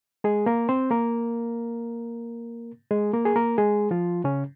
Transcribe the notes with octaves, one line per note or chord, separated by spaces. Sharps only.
G#3 G#4
A#3 A#4
C4 C5
A#3 A#4
G#3 G#4
A#3 A#4
G#4
A#3 A#4
G#3 G#4
F3 F4
C#3 C#4